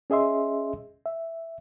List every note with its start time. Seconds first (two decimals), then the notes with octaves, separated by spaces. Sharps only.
0.10 C#4 G#4 D#5 E5 C6
1.06 E5